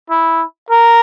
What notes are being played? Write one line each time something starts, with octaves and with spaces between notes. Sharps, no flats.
E4
A#4